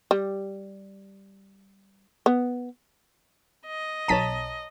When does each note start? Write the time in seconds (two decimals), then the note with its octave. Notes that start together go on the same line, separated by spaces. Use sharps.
0.11 G3
2.26 B3
3.67 D#5
4.08 B1 C#5 A5 A#5 B6 D#7